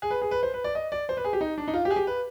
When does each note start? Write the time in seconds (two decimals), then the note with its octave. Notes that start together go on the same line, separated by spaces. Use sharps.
0.02 G#4
0.11 B4
0.22 G#4
0.31 B4
0.43 C5
0.54 B4
0.64 D5
0.75 D#5
0.92 D5
1.09 C5
1.17 B4
1.24 G#4
1.33 G4
1.41 D#4
1.58 D4
1.68 D#4
1.74 F4
1.85 G4
1.90 G#4
1.96 G4
2.07 B4